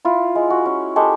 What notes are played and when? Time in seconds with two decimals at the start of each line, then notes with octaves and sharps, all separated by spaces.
0.05 E4 F4
0.35 G#3
0.50 F#4
0.66 C#4
0.96 G#3 G4 A4